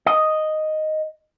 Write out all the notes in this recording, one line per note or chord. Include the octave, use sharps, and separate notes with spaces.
D#5